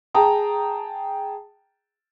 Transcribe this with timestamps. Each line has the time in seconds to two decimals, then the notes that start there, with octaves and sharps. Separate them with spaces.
0.14 G#4 G5 A5 A#5 D#6